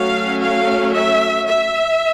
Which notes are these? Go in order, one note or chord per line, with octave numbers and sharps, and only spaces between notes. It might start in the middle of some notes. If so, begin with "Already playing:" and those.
Already playing: F#3 A3 C#4 F5
F5
E5
E5